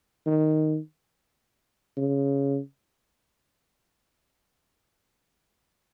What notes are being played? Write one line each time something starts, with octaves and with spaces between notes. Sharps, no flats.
D#3
C#3